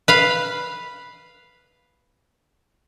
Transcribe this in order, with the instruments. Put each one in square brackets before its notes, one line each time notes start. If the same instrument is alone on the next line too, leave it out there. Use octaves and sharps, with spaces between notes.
[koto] B4 F5